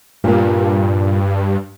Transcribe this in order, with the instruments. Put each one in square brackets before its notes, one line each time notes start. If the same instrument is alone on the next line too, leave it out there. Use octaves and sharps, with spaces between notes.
[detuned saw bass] G2 [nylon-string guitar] A#2 A#3